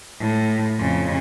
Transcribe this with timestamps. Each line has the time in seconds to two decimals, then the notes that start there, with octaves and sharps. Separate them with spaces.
0.19 A2
0.80 F2 C#3